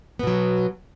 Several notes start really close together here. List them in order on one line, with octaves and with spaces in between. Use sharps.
B3 B2 F#3